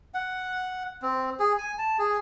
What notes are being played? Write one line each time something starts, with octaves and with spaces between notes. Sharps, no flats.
F#5
C4
G#4
G#5
A5
G#4